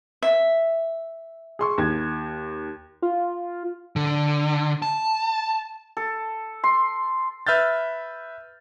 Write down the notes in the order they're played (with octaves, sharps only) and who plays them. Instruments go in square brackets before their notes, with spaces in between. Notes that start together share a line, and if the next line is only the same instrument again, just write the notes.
[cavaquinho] E5
[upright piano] G#4 C6 C#6
D#2 G#6
[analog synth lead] F4
[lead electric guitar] D3
A5
[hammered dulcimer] A4
C6
[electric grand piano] B4 E5 F6 G6 A6